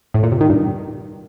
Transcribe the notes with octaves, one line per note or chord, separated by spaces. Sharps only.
A2
A#2
C3
D#3
G2